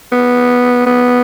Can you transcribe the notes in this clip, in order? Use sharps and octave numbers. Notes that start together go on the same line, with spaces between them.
B3
B3